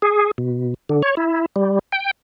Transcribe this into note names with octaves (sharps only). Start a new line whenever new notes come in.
G#4
B2
D3
C#5
E4
G3
G5